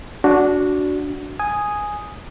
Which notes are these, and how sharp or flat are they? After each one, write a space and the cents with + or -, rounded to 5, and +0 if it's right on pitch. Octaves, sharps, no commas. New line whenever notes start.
D4 -10 F#4 +0
G#5 +0 D#6 +0